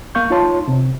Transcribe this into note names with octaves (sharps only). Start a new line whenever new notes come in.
A#3 F5 C#6 G6
D#4 F4 C#5 A5 C6
C3